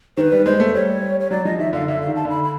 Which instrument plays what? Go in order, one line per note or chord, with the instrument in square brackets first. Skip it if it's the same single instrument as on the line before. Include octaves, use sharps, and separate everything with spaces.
[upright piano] D#3 [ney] B4 C5
[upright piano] G3
[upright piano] G#3 [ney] C5
[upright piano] A3
[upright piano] G3 [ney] C#5
[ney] C#5
[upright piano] F#3 [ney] D5
[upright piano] F3 [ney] D#5
[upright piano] D#3 [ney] E5
[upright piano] D3 [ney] F5
[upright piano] D3 [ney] E5
[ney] F5
[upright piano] D#3
[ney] A5
[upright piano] D3 [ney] B5
[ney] B5